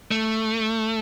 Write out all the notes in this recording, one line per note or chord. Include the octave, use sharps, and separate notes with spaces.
A3